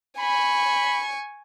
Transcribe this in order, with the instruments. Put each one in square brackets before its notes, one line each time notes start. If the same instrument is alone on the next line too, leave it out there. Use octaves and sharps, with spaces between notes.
[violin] G#5 C#6 [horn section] B5